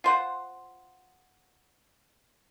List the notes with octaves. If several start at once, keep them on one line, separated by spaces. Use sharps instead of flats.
F4 C5 F#5